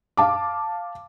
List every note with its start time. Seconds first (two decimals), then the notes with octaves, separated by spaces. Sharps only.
0.17 F5 A5 D6